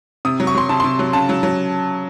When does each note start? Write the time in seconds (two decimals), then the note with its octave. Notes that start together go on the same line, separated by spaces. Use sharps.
0.25 C3 D#6
0.40 F#3
0.47 C#6
0.55 F#3 C6
0.69 C3 A5
0.80 C3 C6
0.99 F#3
1.13 C#3 A5
1.29 F#3
1.43 F#3